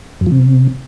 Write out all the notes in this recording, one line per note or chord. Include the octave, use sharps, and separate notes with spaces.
F#2
F3
C3